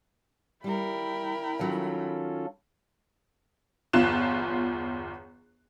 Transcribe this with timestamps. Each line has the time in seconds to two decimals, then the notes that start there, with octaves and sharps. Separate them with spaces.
0.64 G3 E4 A#4 G5 B5
1.59 D#3 F#3 C#4 F4 A4
3.93 G1 E2 F4 F#6 E7